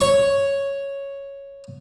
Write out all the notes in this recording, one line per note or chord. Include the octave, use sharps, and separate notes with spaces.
C#5 C#6